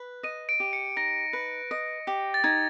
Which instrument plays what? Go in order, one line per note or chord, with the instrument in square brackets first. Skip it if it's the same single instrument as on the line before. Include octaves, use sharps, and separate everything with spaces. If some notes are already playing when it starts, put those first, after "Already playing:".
Already playing: [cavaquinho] B4
[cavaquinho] D#5 [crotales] D#7
[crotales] D7
[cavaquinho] G4
[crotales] C#7
[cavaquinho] D#4 [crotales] A#6
[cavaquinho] B4
D#5
G4
[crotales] A6
[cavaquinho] D#4 [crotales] G#6